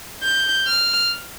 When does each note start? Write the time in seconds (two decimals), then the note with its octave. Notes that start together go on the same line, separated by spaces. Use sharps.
0.23 G6
0.67 F6